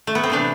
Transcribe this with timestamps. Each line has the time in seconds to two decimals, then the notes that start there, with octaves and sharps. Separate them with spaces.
0.07 A3
0.15 B3
0.23 C4
0.30 C3 E3 A3 D4